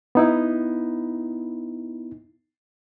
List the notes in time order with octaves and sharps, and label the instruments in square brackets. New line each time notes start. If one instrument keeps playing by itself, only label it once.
[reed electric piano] B3 D#4 E4